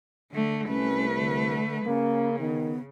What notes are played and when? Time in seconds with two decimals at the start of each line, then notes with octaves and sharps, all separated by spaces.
0.32 D3 A3
0.67 C2 A3 C#4 B4
1.16 D3
1.86 C#3 A#3 C#4
2.39 D#3 B3